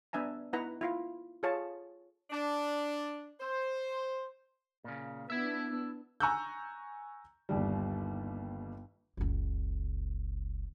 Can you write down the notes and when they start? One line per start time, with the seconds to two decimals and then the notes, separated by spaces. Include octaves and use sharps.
0.13 B3 D4 E5 G#5 A#5
0.53 B3 D#4 E4 B4 F#5 A#5
0.81 E4 F4 F5
1.43 F4 G#4 A4 C#5 F5 A5
2.30 D4
3.40 C5
4.84 A#2 C#3
5.30 B3 D4 E4 E5
6.20 G#5 A#5 C#6 E6 F#6 G6
7.49 G1 D#2 G3
9.17 F#1 C#2